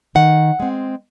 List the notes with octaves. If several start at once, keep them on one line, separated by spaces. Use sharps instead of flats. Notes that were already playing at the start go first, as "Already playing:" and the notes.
D#3 F#5
G#3 C4